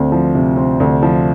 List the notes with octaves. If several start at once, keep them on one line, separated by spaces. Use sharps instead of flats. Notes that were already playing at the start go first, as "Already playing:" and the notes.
Already playing: D2 C4
F3
C3
C4
D2
F3